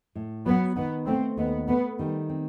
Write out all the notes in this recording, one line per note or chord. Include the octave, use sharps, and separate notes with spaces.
A2
F#3 B3
D#3 B3
A3 C4
D#2 B3
A3 B3
D#3 G3
C4